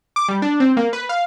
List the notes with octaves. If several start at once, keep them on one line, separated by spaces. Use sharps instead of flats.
D6
G3
D4
C4
A#3
B4
F5